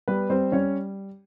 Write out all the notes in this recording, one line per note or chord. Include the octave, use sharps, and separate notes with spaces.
G3 B3 B4
G3 C4 C5
G3 C#4 C#5